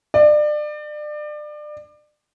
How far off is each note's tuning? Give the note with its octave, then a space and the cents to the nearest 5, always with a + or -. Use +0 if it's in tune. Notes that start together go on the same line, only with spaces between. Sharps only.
D5 +30